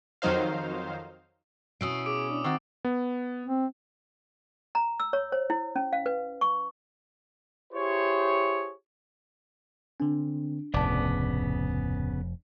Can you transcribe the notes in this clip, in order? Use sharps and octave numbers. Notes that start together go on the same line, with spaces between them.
F2 D#3 F#3 D#4 C5 F5
B2 C#4 E4 D#6 E6 C7 D7
G#4 D6 D7
D4
D#3 C4 F#4 E6
B3
C4
A#5
E6
C#5
C5
E4
C#4
F5
B4
C#6
E4 G4 G#4 C5 C#5
D3 C4 D4
F1 D2 A2 C#3 B3 D5 A5 D6